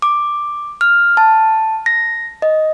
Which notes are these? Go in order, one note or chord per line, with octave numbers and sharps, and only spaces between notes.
D6
F6
A5
A#6
D#5